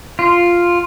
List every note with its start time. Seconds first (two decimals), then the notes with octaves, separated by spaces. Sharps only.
0.19 F4